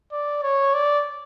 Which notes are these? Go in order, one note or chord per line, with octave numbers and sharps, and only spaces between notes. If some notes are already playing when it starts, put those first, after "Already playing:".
D5
C#5
D5